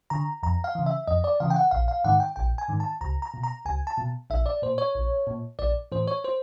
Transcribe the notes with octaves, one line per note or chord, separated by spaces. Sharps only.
D3 A#5
F2 A#5
F5
C#3 E3
E5
F2 D#5
D5
C#3 E3 F5
G5
F#5
A#1 F5
F5
G#2 D#3 F#5
G5
A#1 G5
G#5
G#2 D#3
A5
C#2 A#5
A#5
B2
A#5
C#2 G#5
A5
B2
A#1 E5
D5
A#2 C5
C#5
A#1
A#2
A#1 D5
A2 E3 C5
C#5
C5